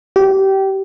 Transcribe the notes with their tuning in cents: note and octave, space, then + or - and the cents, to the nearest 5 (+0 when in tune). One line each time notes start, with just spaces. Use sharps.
G4 -20